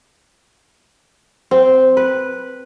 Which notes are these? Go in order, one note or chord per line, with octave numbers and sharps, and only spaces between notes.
C4
B4